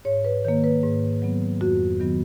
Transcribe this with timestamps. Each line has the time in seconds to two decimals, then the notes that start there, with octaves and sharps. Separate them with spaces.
0.05 G#2 C#5
0.25 B4
0.45 D#3 A#3 C#5
0.64 B4
0.83 G#2
1.22 F#3 B3
1.61 F2 F#4
2.00 D#3 F#3 B3